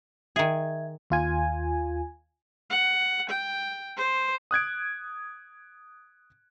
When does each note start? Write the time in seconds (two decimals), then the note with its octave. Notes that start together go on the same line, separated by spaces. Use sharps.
0.36 D#3 G#4 E5 G#6
1.10 D#2 F4 G#5
2.70 F#5
3.29 G5
3.97 C5
4.51 D#6 F#6 G#6 D7